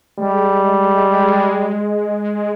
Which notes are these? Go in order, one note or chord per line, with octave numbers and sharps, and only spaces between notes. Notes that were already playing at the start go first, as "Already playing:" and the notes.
G3 G#3